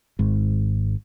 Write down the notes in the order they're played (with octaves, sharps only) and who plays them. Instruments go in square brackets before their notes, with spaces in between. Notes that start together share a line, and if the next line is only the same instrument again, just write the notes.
[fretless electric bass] G#1 G#2